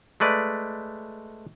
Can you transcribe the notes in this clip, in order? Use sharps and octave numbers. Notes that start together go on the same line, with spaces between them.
G#3 A3 B4 D5